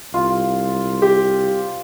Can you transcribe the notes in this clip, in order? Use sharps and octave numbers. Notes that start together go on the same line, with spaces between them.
C2 F4
G4 C5 D5